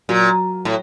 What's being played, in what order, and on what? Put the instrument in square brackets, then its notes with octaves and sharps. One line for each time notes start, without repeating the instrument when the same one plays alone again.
[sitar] A#2 [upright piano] F#3
[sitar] A2